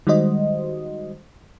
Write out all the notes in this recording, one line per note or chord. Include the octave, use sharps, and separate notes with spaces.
D#3 G3 G#3 F#4 C5 D#5